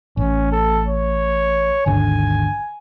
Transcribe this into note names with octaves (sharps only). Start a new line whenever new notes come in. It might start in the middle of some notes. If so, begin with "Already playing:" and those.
A1 C#4
A4
C#5
G#1 D#2 D3 G#5